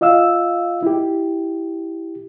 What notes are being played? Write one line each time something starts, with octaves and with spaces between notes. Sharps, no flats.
F4 D#5 F5 E6
E4 G4